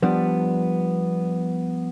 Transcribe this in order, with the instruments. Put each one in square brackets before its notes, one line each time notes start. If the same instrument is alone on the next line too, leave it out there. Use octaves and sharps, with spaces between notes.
[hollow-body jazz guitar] F3 G3 B3 D4